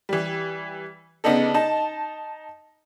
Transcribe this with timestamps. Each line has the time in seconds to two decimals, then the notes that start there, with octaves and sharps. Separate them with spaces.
0.09 E3 G3
1.24 C#3 B3 D4 D#4 A4
1.54 D#4 A5